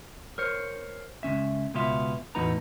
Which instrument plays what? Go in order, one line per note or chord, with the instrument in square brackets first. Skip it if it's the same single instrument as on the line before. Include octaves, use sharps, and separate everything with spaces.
[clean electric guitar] A#4 C5 C#5
C#2 D#3 C#4 E5
C#2 B2 B3 F4 E5
E2 A2 D#4 F#4 B4 A#5